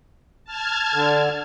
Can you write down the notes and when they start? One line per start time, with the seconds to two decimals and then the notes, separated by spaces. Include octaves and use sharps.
0.45 A5 F6 G#6
0.94 D3